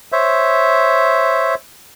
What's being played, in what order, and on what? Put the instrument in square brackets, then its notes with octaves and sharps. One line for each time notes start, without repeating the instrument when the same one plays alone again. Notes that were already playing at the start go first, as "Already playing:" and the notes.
[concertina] C5 C#5 E5